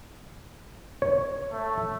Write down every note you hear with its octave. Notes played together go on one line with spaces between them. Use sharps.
C#5
A3